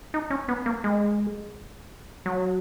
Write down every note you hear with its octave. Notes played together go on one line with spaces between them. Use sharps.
D#4
C#4
B3
A#3
G#3
F#3